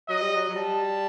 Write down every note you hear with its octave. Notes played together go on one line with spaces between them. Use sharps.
F#3 D#5
G3
F#3
F#3
G3 A5